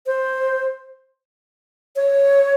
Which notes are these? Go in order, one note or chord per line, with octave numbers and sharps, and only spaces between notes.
C5
C#5